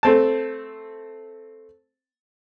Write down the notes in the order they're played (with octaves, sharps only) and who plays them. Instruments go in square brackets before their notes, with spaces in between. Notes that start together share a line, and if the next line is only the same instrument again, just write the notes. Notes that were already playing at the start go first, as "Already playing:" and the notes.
[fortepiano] A3 C4 A5